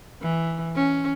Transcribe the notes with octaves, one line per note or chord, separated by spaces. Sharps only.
E3
C#4